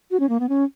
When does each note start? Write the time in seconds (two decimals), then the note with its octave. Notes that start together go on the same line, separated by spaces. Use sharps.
0.11 F#4
0.20 C#4
0.29 A#3
0.40 B3
0.49 C#4